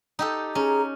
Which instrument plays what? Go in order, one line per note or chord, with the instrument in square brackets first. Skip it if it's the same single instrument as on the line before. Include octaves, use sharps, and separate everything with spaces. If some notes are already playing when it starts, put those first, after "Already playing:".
[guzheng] D#4 G4 A4
[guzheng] C#4 [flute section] G#4 A#5